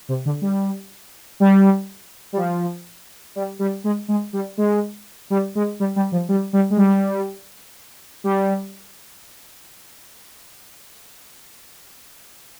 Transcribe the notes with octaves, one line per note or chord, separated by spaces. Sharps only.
C3
D3
G3
G3
G3
F3
G3
G3
G#3
G#3
G3
G#3
G3
G#3
G3
G3
F3
G3
G3
G#3
G3
G3